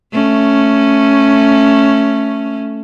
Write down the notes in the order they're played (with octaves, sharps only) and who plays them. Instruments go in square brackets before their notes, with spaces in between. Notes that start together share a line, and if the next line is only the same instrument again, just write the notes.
[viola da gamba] A3 C#4